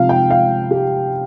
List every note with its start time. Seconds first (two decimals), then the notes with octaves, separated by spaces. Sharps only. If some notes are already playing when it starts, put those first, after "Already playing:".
Already playing: C3 F3 F5
0.09 G5
0.30 F5
0.71 G4